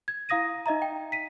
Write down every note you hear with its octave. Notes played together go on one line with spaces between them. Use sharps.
G#6
E4 F5 D#6 A#6 D#7
D#4 D#5 E5 A#5
G5
B6 D#7